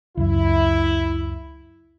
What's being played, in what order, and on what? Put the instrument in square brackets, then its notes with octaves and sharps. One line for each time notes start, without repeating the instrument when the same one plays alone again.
[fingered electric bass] C#2 F#2 [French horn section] E4